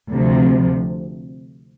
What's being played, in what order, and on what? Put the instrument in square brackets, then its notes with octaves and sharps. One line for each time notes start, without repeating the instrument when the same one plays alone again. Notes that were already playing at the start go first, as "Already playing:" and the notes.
[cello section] D2 C3 F3